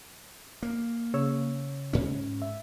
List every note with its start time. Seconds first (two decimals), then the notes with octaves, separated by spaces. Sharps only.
0.63 A#3
1.14 C#3 C#5 E6
1.93 G#2 C#4
2.42 E5